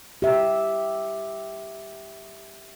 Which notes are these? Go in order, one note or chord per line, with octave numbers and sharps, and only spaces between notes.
G4 E5